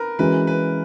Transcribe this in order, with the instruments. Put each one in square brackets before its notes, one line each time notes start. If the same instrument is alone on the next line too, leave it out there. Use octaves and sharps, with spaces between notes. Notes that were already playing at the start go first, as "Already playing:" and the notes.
Already playing: [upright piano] A#4 B4
[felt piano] E3 G#3 C#4 F#4 [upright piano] B4
[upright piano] B4